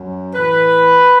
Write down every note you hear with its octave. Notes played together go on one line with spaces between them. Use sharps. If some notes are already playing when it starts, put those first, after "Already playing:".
Already playing: F#2 F#3
A2 E3 B4